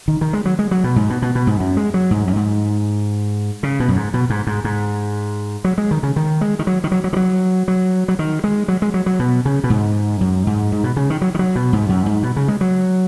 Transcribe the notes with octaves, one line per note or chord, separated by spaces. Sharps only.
D#3
D#3
G#3
F#3
G#3
F#3
B2
G#2
B2
B2
B2
G#2
F#2
G#3
F#3
G#2
F#2
G#2
C#3
B2
F#2
G#2
B2
G#2
G#2
G#2
F#3
G#3
D#3
C#3
D#3
G#3
D#3
F#3
D#3
F#3
F#3
D#3
F#3
F#3
F#3
D#3
G#3
F#3
G#3
F#3
F#3
B2
C#3
B2
G#2
F#2
G#2
G#2
B2
C#3
D#3
F#3
D#3
F#3
B2
G#2
F#2
G#2
B2
C#3
G#3
F#3